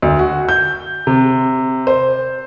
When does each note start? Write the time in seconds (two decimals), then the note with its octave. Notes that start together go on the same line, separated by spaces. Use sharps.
0.02 D2
0.19 F#4
0.49 G6
1.07 C3
1.87 C5